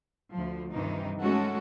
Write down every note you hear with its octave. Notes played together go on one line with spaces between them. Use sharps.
D2 F3
G2 C3 D#3 E3 D#4
G#3 A3 C#4 F#4 A4